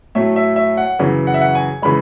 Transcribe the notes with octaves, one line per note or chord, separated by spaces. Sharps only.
A2 F#3 A3 E5
E5
E5
F#5
F#2 C#3 E3
F#5
E5
F#5
G#5
C#3 E3 G#3 B5